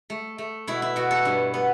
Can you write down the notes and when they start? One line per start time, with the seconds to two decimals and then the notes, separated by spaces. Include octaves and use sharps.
0.10 A3
0.38 A3
0.67 B2 E4
0.82 E4
0.96 B2 F#4
1.11 A4
1.25 G2
1.54 B3